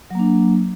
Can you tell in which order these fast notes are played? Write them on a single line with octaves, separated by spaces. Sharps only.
F#3 A#3 D4